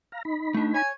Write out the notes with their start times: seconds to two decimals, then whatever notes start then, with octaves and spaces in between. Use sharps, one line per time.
0.12 F5 A#5
0.25 D#4 B5
0.54 A3 D4
0.74 C#5 G#5